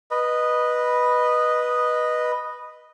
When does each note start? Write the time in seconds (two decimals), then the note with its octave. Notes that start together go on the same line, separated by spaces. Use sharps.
0.11 B4 D#5